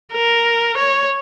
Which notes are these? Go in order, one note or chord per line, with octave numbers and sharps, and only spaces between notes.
A#4
C#5